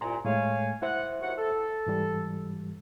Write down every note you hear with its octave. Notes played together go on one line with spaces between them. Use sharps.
C2 A#2 G#5 A#5 C6
A2 G#3 A3 C#5 F5 G#5
E4 C5 E5 F#5
D#2 F#4 F#5
A4
G#2 E3 G3